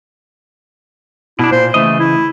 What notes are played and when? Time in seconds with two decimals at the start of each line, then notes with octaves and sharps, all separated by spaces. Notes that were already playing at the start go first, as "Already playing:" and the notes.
1.39 B2 D4 E4
1.52 A#2 C5
1.74 C#3 E3 A3 D#5
2.00 E4